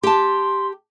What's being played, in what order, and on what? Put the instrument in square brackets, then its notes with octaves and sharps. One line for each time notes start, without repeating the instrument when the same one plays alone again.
[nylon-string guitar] G4 A5 [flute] C6